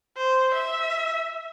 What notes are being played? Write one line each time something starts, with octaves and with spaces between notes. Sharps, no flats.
C5
E5